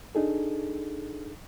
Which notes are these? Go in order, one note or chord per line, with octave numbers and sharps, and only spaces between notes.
D4 D#4 G#4 A4